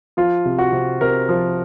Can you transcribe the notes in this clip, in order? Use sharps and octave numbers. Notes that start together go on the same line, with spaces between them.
F3 F4
C3
F#4
C3
C3 A#4
F3